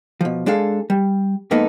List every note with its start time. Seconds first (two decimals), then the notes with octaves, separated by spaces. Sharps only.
0.21 B2 F3
0.46 G#3 D4 G#4 A4 F5
0.90 G3
1.51 F2 G#2 A#3 B3 D#4 A4